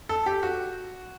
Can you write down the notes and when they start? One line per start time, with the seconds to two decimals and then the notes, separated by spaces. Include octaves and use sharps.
0.09 A4
0.26 G4
0.43 F#4